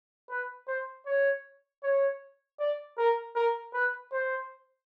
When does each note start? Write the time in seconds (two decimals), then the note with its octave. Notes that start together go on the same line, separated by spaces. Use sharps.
0.30 B4
0.68 C5
1.06 C#5
1.83 C#5
2.60 D5
2.98 A#4
3.36 A#4
3.74 B4
4.12 C5